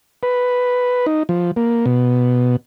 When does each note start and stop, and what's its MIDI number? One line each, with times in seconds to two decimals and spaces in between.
0.23 1.06 71
1.06 1.23 63
1.29 1.51 53
1.56 1.86 58
1.86 2.56 47